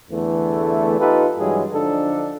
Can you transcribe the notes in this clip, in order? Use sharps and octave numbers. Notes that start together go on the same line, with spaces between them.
E2 D3 E3 A3
D#4 F4 G4 A4 B4
G2 E3 F#3 G#3 G#4
D3 F3 D4 D#4 A4